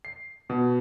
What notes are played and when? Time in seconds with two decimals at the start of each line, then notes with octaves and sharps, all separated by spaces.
0.05 C7
0.50 B2